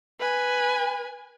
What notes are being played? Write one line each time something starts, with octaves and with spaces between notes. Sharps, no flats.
B4 G#5